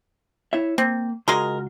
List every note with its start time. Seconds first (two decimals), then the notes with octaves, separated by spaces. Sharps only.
0.53 E4 C#5 E5
0.78 A#3 C4
1.28 C#2 G#3 F#4 G#4 A#4 C6